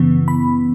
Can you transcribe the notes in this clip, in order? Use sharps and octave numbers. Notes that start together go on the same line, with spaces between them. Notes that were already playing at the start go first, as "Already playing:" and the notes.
Already playing: F#2 C#3 E3 B3
B5